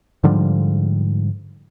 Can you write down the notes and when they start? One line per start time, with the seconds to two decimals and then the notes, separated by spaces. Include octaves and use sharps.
0.24 G#2 D3 F3 G3